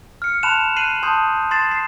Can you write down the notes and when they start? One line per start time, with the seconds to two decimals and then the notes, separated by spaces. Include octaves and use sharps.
0.22 F6 C#7
0.43 A5 B5 C6 F#6 E7 F7
0.76 F#6 C7 D#7 F#7
1.03 A5 C6 D#6 G6
1.51 C6 A6 C7 E7
1.72 C7